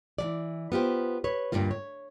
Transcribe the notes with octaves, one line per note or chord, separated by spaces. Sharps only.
E3 F#3 D5
B3 F4 G4 C5
B4 C#5
D2 G2 A#2 A#3 F4
C#5